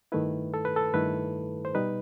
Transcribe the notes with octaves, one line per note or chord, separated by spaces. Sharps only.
G2 D#3 A3 E4 B4
A4
B4
A4
G2 D#3 A3 E4 B4
C5
B2 G3 D#4 B4